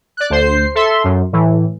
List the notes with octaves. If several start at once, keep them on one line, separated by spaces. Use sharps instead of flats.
D5 F#6
D2 C5 C7
A4 E5 C6
F#2
A2 E3